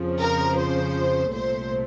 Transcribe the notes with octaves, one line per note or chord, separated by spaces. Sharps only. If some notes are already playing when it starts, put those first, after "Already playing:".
Already playing: F2 C#3 F3
A#4
C5
C2 A#2 A3 C5